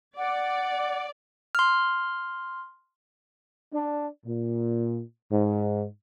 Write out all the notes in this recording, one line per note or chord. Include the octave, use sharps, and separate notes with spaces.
D5 F#5
C6 F6
D4
A#2
G#2